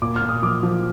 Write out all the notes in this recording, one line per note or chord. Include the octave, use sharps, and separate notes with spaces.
A#2 D6
F6
A#2
D#6
F3 D6
F3